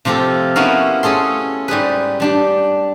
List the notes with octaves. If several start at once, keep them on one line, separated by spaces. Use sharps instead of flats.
C3 F3 F4 G4 A4
B3 C#4 E4 F#4 A#4 F5
C#4 G#4 A4 C6
G#2 G3 G#4 B4
G3 D4 G4